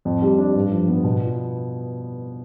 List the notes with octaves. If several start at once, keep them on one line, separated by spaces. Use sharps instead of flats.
F2
G3
D4
G2
F3
B3
B2
F4